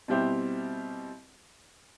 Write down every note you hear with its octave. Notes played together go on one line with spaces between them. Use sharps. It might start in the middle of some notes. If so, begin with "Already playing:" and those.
B2 G3 C4 E4 G4